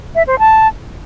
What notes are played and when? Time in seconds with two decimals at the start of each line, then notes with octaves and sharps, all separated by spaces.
0.15 E5
0.27 C5
0.39 A5